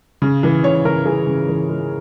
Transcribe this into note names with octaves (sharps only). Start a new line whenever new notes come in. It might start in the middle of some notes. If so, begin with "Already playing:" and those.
C#3
E3
C#3 C#5
C#3 A#4
E3 G#4
C#3
E3
G#3